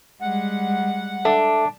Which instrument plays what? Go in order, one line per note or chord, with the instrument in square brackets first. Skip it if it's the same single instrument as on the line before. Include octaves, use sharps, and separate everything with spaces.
[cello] G3 G#3 [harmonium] F#5
[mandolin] D4 [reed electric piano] A4 E5 A5